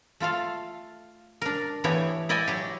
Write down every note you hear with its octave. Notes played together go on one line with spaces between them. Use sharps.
A3 F4 A4 F5
D4 A#4
E3 A3 B3 G4 C#5
E4 D5 D#5 G5 G#5
F#3 G4